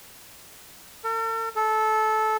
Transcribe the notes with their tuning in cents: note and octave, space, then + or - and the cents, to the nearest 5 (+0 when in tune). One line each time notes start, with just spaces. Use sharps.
A4 +45
A4 -20